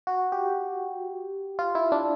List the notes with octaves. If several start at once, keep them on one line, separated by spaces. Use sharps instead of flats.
F#4
G4
F4
E4
D4